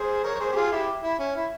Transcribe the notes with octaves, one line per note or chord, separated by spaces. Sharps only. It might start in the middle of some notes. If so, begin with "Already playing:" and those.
Already playing: G#4 C5
A#4 C#5
C#5
G#4 C5
G4
F4 G#4
E4 G4
E4
C#4
E4